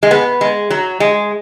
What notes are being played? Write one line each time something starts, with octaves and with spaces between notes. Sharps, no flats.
G#3
B3
G#3
F#3
G#3